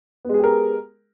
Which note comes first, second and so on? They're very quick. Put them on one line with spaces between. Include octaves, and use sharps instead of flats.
B3 G#3 G#4 G4 A#4